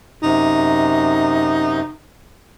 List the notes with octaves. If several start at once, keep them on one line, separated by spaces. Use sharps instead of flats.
F#2 C3 D#4